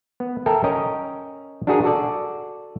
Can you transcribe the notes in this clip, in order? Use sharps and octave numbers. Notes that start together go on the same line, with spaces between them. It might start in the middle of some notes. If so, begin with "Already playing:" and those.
B3
A4 A#4 E5 G5
C#4 A#4 D#5 G5
D4 F#4 G#4 A#4
F#4 A4 D5